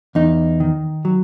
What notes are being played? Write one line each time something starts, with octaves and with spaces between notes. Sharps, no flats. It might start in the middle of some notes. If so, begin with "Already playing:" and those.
E2 D#4
D#3
F#3